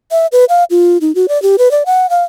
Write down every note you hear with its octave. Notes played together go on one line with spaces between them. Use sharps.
E5
B4
F5
F4
D#4
F#4
D5
G4
B4
D5
F#5
F5